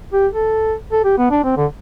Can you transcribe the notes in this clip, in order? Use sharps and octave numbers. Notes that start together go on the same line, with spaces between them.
G4
A4
A4
G4
B3
D4
C4
D3